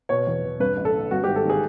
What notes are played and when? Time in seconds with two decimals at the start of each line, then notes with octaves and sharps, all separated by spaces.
0.09 B2 C#5
0.27 E2
0.44 E2
0.60 G2 B4
0.77 A1
0.85 A4
0.94 D3
1.11 G2 F#4
1.24 G4
1.28 G#1
1.36 A4
1.45 D#3 G#4